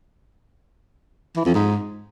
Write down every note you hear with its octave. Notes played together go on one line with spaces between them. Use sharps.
E3
F2
G#2